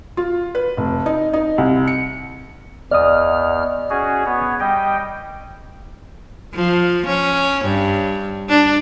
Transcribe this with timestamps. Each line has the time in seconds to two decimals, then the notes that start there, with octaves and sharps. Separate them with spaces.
0.17 F4
0.55 B4
0.77 F1
1.06 D#4
1.33 D#4
1.58 C2
1.87 C#7
2.91 E2 D5 D#5 D#6 F6
3.90 C#4 F#4 G#4
4.26 B3 C#5
4.60 G3 D#5 G5
6.54 F3
7.06 C#4
7.65 G2
8.49 D4